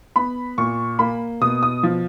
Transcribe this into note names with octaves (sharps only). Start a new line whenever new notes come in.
B3 B5
A#2 C#6
A#3 B5
B2 D#6
D#6
F3